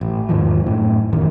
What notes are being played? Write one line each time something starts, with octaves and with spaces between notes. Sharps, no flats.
A1
E2 G#2 D#3 F3
F#2 A2
A1 F#2 D#3